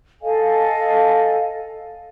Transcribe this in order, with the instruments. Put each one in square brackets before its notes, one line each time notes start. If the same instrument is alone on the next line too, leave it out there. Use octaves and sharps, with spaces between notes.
[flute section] A4 D#5 F5 G#5